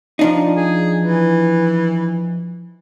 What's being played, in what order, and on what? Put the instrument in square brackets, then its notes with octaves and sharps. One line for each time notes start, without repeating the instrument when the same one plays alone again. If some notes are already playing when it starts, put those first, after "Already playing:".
[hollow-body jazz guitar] F3 D4 D#4
[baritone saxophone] G#4
E3